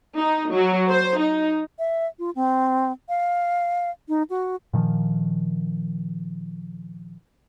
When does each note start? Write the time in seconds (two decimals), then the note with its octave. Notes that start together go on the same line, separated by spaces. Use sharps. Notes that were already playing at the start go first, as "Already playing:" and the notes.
0.17 D#4
0.53 F#3
0.91 C5
1.20 D#4
1.79 E5
2.19 F4
2.35 C4
3.09 F5
4.08 D#4
4.30 F#4
4.74 A#2 D#3 F3